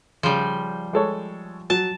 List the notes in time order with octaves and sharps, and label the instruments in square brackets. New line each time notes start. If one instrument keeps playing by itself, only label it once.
[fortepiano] C#3 [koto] F3 G3
[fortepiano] G#3 A4 C#5
[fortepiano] F#3 [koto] A5